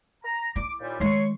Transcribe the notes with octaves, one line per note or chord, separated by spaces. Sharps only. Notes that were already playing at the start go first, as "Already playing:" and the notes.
A#5
E4 D6
D#2 A#2 G3
D#3 G#3 C#5 C6 C#6